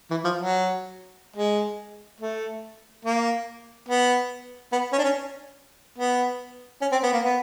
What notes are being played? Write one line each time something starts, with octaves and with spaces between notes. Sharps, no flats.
E3
F3
F#3
G#3
A3
A#3
B3
B3
C#4
D4
C#4
B3
C#4
C4
B3
A#3
B3